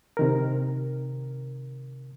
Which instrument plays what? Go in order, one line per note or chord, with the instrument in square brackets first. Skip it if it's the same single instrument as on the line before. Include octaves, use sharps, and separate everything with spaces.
[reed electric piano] C3 D#3 A#4